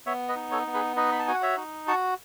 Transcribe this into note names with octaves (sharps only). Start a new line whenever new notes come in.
B3 C#5 E5
B4 D#5
D#4
A4 C#5
B3
G#4 B4
D#4 B4 D#5
B5
A5
F#4 G#5
F#5
C#5 E5
D#4
F#4 A5 C#6